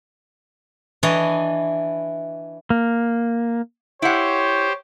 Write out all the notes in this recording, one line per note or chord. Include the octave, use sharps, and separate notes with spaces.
E3 D4 C#5 D#5 A#5
A#3
E4 G4 C5 C#5 F#5